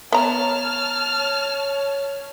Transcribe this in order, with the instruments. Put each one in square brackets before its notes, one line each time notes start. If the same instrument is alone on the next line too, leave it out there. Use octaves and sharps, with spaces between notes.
[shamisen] B3 A#5 [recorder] C#5 [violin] A5 F6